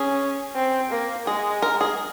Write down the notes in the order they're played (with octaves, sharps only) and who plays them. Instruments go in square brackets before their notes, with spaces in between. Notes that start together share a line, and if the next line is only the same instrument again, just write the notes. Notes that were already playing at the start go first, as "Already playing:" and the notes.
Already playing: [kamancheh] C#4 [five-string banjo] G#4
[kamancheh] C4
A#3
[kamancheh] G#3 [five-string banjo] G#4
[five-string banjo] A#4
G#4